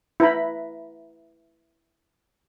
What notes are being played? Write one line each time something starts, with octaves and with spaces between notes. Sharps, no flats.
E4 B4 A#5 B5